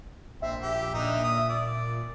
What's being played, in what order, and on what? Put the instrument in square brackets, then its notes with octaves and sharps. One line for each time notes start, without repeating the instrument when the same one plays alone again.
[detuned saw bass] A#1 [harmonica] C4 [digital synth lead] E5
[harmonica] G4
[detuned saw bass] A#2 [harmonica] D3 D#4
[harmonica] D#6
D5